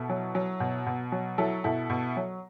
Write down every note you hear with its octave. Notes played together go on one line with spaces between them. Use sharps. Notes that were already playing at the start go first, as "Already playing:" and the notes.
Already playing: B2 E4 A4
F#3
F#3
B2
B2
F#3
F#3 E4 A4
B2 E4 A4
B2
F#3